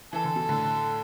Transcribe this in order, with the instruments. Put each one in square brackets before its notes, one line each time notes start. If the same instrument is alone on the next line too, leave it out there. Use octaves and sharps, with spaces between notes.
[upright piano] E3 [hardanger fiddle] A4
[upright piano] D3
B2
A2 D3